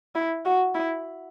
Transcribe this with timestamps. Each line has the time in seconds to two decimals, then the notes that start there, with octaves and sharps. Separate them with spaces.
0.15 E4
0.45 F#4
0.74 E4